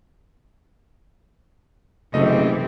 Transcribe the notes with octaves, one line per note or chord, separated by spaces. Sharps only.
F#1 C3 E3 A3 C4 D#5